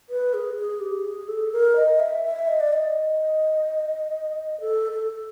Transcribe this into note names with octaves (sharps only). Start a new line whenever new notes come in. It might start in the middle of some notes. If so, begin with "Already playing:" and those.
B4
G#4
G#4
G4
G#4
A4
A#4
D#5
E5
E5
D#5
D5
D#5
A4
A4